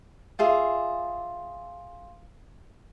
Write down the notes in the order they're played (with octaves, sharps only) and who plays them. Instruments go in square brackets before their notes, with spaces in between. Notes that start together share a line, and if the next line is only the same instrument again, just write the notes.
[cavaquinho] F4 G#4 E5